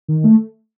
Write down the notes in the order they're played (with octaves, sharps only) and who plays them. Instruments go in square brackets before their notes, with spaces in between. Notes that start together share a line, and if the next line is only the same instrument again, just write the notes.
[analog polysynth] D#3
A3